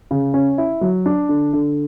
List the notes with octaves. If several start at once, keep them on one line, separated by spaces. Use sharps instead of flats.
C#3
C#4
E4
F#3
D4
D3
D3